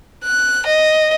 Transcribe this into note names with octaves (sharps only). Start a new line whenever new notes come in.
F#6
D#5